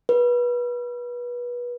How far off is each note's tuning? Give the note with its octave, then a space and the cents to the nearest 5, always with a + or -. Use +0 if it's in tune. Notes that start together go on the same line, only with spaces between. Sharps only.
B4 -25